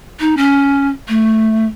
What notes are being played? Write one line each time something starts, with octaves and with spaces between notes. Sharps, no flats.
D#4
C#4
A3